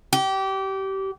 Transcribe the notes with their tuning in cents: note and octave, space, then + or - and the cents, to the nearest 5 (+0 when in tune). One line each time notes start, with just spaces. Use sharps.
G4 -25